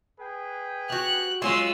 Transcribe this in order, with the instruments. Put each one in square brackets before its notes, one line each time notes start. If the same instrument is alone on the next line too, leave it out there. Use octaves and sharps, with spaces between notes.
[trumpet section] G#4 B4 G5
[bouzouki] F#4 G4 [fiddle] F#6
[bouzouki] F#3 C#4 F4 [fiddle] G#3 E6 [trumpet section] C6